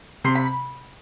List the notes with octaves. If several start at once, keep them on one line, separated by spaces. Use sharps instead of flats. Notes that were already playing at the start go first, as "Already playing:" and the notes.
C3 C6
B5